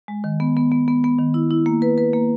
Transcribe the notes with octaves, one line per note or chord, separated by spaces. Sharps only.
G#3
D#3
B3
B3
B3
B3
B3
D#3
E4
E4
A#3
B4
B4
A#3